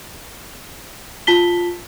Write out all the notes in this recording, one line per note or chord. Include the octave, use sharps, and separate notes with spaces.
F4 A5 B6 G7